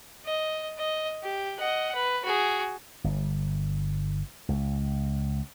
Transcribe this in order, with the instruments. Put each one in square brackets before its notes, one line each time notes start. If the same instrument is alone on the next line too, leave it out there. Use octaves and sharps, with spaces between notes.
[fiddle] D#5
D#5
G4
D#5 F#5
B4
F#4 G#4
[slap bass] G1
C#2